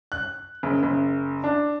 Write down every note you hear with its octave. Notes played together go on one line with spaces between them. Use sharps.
F#6
F#1
F#1
D4